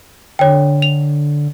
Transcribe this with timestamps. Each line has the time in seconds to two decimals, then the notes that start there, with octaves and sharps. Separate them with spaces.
0.39 D3 C#5 G5
0.82 F7